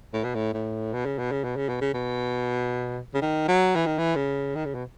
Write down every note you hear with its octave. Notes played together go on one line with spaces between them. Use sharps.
A2
B2
A2
A2
B2
C#3
B2
C#3
B2
C#3
B2
C#3
B2
C#3
D#3
F#3
E3
D#3
E3
C#3
D#3
C#3
B2